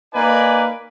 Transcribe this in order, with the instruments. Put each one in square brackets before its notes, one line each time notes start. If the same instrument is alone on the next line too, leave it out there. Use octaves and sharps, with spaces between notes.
[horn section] A#3 D#4 B4 D5 G#5